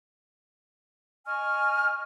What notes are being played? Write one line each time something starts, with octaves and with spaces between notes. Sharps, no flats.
D#5 G#5 C#6 F6